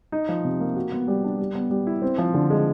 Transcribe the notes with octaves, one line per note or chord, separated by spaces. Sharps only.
D#4
F3
C3
A#3
F#4
B3
G3
D4
G3
B3
G3
E4
C4
F3
D3
G#3